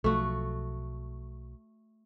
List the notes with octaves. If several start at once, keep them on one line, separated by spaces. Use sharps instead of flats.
B1 F3 A3 F#4